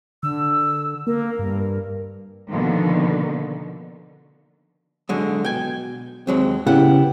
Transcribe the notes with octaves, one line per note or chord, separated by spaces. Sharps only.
D3 E6
A#3 A#4
G2
B2 D3 D#3 F3 A#3
D3 F#3 G#3
B2 G5 G#5
D#2 F#3 G#3 C4
C#3 B3 C#4 E4 G4 F#5